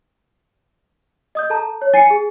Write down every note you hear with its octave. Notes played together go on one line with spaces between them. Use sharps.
D#5 D#6 G6
A4 A5 A#5
C#5
G#5 A6 C7 C#7
G#4